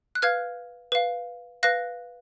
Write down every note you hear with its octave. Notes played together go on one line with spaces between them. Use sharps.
F#6
B4 F5 F6 G#6
B4 F5
B4 F5 F#6 A#6